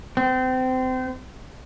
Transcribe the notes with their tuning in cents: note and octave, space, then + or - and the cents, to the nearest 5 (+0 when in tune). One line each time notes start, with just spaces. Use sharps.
C4 -30